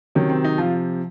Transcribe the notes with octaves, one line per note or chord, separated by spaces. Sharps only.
C3 D#3 F#3 C#4
C4
D#4
C3 F3 F4